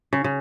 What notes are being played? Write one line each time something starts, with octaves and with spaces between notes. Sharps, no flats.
C#3
C#3